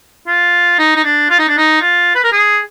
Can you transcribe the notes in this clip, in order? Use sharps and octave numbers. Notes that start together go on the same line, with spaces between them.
F4
D#4
D#4
D4
F4
D#4
D4
D#4
F4
B4
A#4
G#4